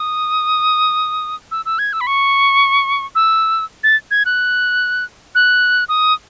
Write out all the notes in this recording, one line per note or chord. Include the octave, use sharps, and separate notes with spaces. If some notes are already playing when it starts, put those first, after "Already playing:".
Already playing: D#6
E6
E6
G#6
E6
B5
C#6
E6
A6
G#6
F#6
F#6
D#6